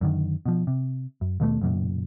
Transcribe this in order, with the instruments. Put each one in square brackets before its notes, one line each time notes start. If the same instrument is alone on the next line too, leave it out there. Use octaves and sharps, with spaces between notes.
[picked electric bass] F#2 D3 D#3
B2 F3
C3
F#2
D#2 B2 G3 A3
F#1 B1 F#2 A#2